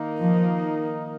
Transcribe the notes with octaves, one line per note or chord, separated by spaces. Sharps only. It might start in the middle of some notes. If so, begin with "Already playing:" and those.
Already playing: D#3 A#3 D#4
F3